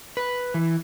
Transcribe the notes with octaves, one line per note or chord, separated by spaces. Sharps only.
B4
E3